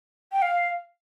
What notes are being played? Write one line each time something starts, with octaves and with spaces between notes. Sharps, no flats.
G5
F5